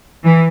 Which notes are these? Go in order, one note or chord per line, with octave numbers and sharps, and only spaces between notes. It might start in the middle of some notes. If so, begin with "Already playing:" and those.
E3